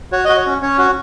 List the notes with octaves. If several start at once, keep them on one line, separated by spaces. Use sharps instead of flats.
F#4 C#5
F#4 D#5
C#5
C#4
C#4 C#5
F#4